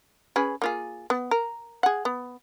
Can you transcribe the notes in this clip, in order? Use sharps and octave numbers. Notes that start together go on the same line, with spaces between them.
C#4 G#4 B4
A#3 F4 G#4
B3
A#4
G#4 F#5
B3